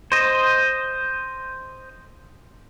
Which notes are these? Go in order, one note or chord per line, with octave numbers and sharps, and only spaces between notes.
C5 D#5